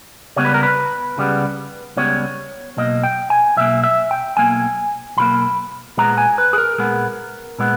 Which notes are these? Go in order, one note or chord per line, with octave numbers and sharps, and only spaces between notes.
C#2 C#3 G3 B3 C#5
B4
A#4
B4
C#2 C#3 G3 B3
C#2 C#3 G3 B3 C#5
B1 B2 A#3 D#5
G5
G#5
B1 B2 A#3 E5
E5
G5
B1 B2 A#3 G#5
B1 B2 A#3 B5
A#2 G#3 B3 A#5
G#5
B4
G#4
A#4
A#2 G#3 B3
A#2 G#3 B3